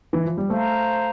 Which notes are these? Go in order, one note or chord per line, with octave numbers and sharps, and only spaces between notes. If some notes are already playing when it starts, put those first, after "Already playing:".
E3
F3
G3
A3 C5 F5 A#5